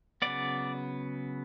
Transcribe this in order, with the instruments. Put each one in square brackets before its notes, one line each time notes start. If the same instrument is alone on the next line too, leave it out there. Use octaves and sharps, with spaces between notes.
[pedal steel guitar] C#3 F#3 B3 D5